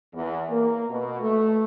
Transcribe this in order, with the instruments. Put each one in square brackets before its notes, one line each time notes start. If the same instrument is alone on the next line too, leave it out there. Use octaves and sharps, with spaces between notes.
[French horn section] E2
A#3
B2
A3